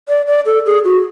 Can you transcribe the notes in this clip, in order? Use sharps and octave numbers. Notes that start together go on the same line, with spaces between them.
D5
D5
A4
G#4
F#4